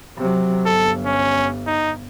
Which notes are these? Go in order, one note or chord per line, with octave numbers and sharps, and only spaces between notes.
C3 F#3
G1 A4
C#4
D#4